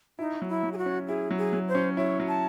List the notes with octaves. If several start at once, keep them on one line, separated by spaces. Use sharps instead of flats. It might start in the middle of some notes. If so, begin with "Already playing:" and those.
D#4 E4
F#3
E4
F#3
G#4
F#4
C#4
E4 G#4
F#3
G#4
F#3
C5
C#4
E4 C#5
F#3
A5